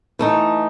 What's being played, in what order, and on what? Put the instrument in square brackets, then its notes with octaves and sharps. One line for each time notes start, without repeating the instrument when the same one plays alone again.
[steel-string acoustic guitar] E3 A3 D#4